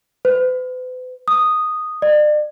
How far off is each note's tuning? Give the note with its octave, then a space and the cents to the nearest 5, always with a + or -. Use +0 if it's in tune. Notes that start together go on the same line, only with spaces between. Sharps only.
B4 +45
D#6 -5
D5 +40